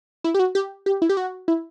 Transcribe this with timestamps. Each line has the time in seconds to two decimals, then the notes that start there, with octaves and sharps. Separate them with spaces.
0.24 E4
0.35 G4
0.39 F#4
0.55 G4
0.86 G4
1.02 E4
1.09 G4
1.17 F#4
1.48 E4